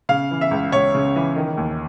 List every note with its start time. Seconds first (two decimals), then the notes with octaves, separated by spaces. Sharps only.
0.09 C#3 F5
0.31 E3
0.41 E5
0.51 C#2
0.72 C#2 C#5
0.95 C#3
1.16 E3
1.36 D#3
1.57 D#2